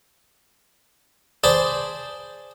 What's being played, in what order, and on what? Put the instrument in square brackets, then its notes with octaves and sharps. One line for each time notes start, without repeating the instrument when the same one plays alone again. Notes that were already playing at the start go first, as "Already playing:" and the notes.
[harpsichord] G#4 C5 D5 A5 B5 C6